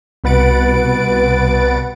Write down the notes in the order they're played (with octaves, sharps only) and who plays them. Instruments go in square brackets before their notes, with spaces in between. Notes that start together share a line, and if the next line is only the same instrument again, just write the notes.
[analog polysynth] C2 B2 B4 F#5 A6 D7